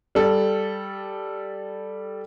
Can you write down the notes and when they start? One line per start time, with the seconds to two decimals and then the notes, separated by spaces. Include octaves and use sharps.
0.15 G3 A4